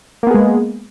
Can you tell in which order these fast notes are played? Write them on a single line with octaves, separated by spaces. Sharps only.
A#3 B3 G#4 G#3